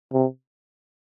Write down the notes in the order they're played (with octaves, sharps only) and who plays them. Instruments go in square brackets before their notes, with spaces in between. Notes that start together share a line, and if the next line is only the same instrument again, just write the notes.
[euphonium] C3